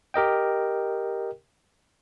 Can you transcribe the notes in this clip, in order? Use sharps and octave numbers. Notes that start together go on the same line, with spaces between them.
G4 A#4 D#5 G5